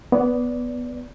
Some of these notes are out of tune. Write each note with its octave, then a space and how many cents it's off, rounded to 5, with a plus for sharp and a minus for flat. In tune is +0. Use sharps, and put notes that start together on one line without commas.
B3 +0 D5 -15